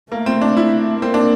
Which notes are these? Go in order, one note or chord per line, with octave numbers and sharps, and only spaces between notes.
A3 A#3
C4
D4
E4
A#3 C4
D4